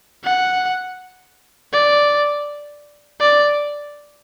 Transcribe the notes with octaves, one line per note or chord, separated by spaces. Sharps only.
F#5
D5
D5